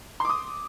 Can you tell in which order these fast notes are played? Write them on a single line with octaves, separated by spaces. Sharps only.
C6 D6 D#6